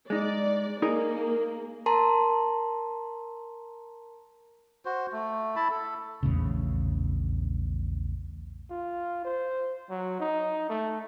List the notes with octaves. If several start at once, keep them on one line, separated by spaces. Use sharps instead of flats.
G#3 D#4 D5
A#3 D#4 G#4 A#4
A#4 A5 A#5 C6
F#4 C5
A3
E4 A5 B5
A4
A#1 E2 A2 C#3
F4
C5
F#3
D#4
A3